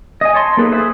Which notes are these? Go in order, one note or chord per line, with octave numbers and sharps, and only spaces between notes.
D#5 G#5
C#5 A5 C6
A#3 D#4 G#4 A4 B4
G#4 B4 C5 E5